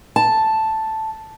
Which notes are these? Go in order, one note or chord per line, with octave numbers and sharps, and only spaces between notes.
A5